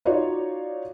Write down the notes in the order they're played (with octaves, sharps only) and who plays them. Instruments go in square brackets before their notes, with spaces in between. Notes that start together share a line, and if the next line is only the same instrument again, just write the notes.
[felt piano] D#4 F4 F#4 C#5 D5